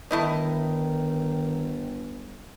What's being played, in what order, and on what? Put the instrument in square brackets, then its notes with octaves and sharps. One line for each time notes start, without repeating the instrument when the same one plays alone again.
[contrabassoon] G1 [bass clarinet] D#3 [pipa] A3 E4 D#5